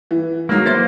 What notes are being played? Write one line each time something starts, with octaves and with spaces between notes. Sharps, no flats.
E3
D#3 F#3 G#3 A#3
B3 E4 C5 A6